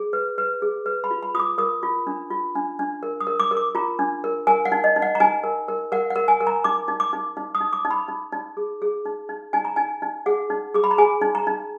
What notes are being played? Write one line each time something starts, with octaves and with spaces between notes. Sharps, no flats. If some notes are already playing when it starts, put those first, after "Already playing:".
Already playing: G#4
B4
B4
G#4
B4
B5
F4
B5
F4 D#6
D6
A#4 D#6
F4
D4
F4
D4
D4
A#4
D#6
A#4
D6
A#4
D6
F4 A#5
D4
A#4
A#4 G#5
F#5
D#4
D#5
D#4
F#5
A#5
D#4 G#5
A#4
A#4
A#4 F#5
F#5
A#4
G#5
A#4
A#5
D#4 D6
D#4
D6
D#4
D#4
D#6
D#4
D6
D#4
B5
D#4
D#4
G#4
G#4
D#4
D#4
D#4 G#5
A#5
D#4 G#5
D#4
G#4 F#5
D#4
G#4 D6
B5
A#5
G#4 G#5
D#4
A#5
D#4